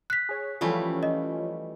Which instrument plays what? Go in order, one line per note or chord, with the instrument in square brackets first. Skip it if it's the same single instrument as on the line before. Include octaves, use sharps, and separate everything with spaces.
[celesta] F#6 B6
[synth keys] G#4 C#5
[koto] E3 G3 A3 [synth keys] F3 C#4 F4
[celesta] D#5